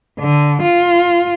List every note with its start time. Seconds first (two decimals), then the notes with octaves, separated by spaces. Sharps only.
0.19 D3
0.63 F4